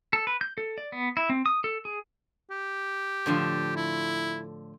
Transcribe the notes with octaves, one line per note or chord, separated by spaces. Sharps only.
A4
B4
G6
A4
D5
B3
E4
C4
D#6
A4
G#4
G4
A2 D3 F3
E4